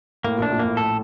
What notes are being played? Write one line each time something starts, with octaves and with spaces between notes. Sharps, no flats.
A2 A#3
A#1 A#2
D4
A#1 A#2
A2 A#3
A2 A4